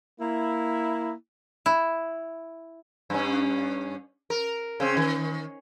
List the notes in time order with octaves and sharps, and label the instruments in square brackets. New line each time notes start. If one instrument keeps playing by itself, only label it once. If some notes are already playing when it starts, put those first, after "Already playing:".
[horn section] A#3 E4
[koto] E4
[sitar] G2 C#4
A#4
C#3 C4
D#3